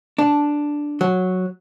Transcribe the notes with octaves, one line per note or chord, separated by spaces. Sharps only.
D4
F#3